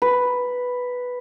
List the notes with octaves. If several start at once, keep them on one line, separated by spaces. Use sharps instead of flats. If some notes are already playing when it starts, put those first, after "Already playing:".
B4